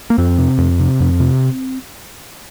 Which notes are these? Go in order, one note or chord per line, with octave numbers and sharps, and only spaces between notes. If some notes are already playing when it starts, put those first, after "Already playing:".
A#3
F2 C4
C3
F2
C3
F2
C3